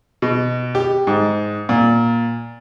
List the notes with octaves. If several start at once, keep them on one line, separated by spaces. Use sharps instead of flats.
B2
G4
G#2
A#2